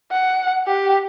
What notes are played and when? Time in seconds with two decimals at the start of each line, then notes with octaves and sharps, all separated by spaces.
0.12 F#5
0.67 G4